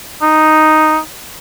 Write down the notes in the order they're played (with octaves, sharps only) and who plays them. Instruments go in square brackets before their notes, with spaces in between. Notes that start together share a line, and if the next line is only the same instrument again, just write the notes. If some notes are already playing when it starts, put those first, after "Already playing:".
[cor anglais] D#4